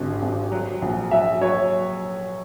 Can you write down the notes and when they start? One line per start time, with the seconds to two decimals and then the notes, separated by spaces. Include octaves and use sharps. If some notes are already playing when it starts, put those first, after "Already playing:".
Already playing: G#1 G2 D3
0.22 G#1
0.52 F#3
0.82 A#1
1.11 F#3 E5
1.41 F#3 C#5